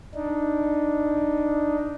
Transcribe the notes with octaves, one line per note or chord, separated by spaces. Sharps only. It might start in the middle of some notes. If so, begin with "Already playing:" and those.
D4 D#4